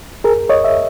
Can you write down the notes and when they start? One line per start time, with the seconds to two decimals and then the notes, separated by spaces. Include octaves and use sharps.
0.24 G#4 A#4
0.49 C#5 D#5
0.64 E5